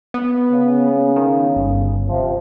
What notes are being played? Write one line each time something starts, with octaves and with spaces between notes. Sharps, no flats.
B3
C#3
D#3
G1
C3 F3